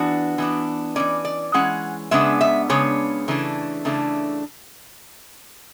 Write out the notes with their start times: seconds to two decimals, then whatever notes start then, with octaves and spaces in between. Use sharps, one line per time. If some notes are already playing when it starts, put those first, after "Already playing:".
Already playing: E3 B3 D4 F#4
0.38 E3 B3 D4
0.96 E3 G#3 C#4 D5
1.25 D5
1.54 E3 G#3 C#4 F#5
2.11 C#3 G#3 B3 D4 E5
2.41 E5
2.69 C#3 G#3 B3 D4 C#5
3.28 C#3 E3 A3 D4
3.85 C#3 E3 A3 D4